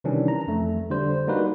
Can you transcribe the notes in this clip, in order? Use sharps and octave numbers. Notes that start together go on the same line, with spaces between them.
C3 D#3 E3 G3 C#4 D4
A#5
F2 A3
D3 G3 C5
G3 A#3 D#4 F#4 B4